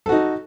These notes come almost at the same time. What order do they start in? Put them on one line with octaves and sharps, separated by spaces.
A4 F#4 D#4